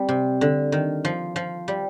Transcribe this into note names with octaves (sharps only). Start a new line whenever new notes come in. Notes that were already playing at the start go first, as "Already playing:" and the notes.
Already playing: G3 C4
C3
D3
D#3
F3
F3
G3